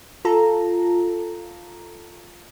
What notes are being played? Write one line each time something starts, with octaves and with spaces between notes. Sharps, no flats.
F4 A4 A#5